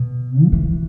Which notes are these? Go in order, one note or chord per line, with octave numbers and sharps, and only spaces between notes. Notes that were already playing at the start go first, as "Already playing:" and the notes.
Already playing: B2
F#3
E3